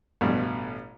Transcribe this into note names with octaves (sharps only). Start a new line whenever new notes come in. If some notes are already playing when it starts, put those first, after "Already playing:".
A1 G2 B2